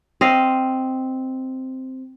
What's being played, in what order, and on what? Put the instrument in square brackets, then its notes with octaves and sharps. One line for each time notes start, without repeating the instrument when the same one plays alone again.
[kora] C4 D#5 F5